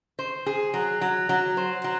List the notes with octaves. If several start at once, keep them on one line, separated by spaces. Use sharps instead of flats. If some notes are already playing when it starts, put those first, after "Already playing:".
C5
G#4
F#3
F#3
F#3
C5
F#3